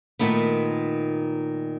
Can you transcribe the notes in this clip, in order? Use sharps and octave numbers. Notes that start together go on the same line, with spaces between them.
A#2 D#3 A3 B3